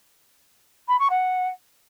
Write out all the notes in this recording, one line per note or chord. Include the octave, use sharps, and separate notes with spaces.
B5
C#6
F#5